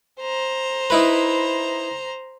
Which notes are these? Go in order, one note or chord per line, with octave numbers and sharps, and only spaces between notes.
C5 A#5
D#4 E4 B4